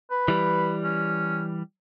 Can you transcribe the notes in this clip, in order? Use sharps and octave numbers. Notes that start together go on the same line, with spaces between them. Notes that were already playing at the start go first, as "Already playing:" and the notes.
B4
E3 G3
C#4